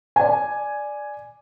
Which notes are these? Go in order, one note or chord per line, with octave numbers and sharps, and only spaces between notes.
D5 G#5